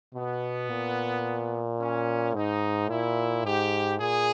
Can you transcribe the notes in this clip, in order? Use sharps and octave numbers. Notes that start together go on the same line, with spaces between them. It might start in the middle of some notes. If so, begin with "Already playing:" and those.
B2 B3
A#2
C#4
G#2 D#4
A#2 E4
G#2 G4
A#2 G#4